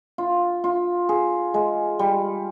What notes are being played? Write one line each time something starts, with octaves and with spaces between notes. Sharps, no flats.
F4
F4
G#4
G#3
G3